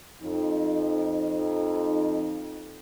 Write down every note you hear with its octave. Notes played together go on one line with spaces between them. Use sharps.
F2 D#4